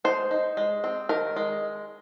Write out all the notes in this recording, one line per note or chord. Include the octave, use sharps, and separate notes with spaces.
G#3 C5
D#4
G#3
C4
D#3 A#4
G#3